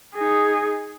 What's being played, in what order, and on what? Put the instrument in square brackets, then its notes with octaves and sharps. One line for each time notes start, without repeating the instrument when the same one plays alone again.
[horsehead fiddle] D#4 G#4